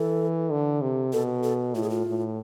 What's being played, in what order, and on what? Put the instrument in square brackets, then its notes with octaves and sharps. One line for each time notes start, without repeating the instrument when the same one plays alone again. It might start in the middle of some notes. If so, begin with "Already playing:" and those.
Already playing: [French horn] E3 [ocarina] A4
[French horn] D3
C3
[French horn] B2 [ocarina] A4
[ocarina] A4
[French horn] A2 [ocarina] F4
[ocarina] G#4
F4
[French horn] A2